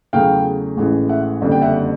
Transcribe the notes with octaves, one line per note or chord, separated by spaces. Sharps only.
E2 C#3 F#3 A3 F5 G5
A1 A2 E3 G#3
E5 F#5
F#1 F2 D3 G3 F#5
G5
E5 F#5